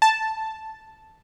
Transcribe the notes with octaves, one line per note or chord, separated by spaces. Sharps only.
A5